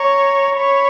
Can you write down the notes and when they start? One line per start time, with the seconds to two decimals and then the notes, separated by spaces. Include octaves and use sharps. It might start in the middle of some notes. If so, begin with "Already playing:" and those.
Already playing: C#5 A#5
0.56 C#5 B5